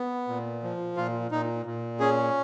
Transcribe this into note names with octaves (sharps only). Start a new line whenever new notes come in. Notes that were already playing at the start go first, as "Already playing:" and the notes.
Already playing: B3
A#2
F3
A#2 F4
A#2 D#4
A#2
C#4 G#4